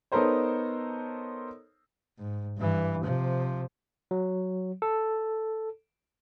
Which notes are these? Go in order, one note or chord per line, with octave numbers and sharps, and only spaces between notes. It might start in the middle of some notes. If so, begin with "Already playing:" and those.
B3 D#4 A4 A#4 C5 C#5
G#2
G2 E3
C3 F3
F#3
A4